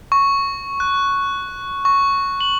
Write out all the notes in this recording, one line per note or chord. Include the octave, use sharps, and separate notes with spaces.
C#6
F#6
C#6
F#7